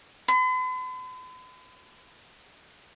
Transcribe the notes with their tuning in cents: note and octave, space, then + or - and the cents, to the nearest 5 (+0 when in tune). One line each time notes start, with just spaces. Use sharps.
B5 +45